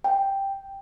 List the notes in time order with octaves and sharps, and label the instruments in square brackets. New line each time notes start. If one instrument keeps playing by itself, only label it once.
[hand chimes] G5